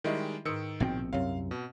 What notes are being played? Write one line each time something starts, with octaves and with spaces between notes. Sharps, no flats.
D#3 G3 G#3 E4 D#5 E5
G#2 D#3 B4 D#6 E6 C#7
A#1 B2 C4 F#4 G5
C2 F#2 C4 C#5 F5
B2